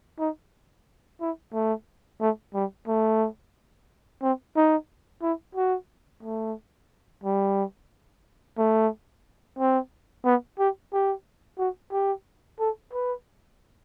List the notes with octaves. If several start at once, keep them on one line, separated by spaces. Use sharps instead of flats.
D#4
E4
A3
A3
G3
A3
C4
D#4
E4
F#4
A3
G3
A3
C4
B3
G4
G4
F#4
G4
A4
B4